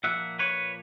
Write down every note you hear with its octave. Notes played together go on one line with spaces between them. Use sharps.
A#2 F3 A#3 E5 F#5
B4 C#5